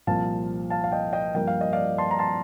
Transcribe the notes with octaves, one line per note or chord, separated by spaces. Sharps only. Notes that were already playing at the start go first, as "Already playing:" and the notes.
C2 A#2 F3 F5 A5
F5 A5
F5
D#5 G5
D#5 G5
G2 F3 A#3 G5
F5
D#5
D5 F5
A5 C6
A#5
A5 C6